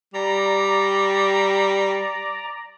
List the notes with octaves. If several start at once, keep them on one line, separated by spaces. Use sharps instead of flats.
G3 D5 A#5